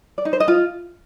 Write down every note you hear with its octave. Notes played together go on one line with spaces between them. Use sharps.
D5
D#4
C5
D#5
F4